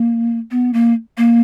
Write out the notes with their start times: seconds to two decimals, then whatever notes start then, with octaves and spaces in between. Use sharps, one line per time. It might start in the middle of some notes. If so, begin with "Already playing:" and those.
Already playing: A#3
0.51 B3
0.74 A#3
1.18 A#3